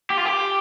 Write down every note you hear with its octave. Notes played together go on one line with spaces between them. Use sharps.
G4
F4
G4